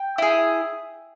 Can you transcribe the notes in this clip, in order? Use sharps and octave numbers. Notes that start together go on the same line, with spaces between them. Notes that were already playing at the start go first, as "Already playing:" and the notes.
Already playing: G5
E4 G#4